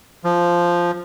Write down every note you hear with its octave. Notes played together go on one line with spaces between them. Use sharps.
F3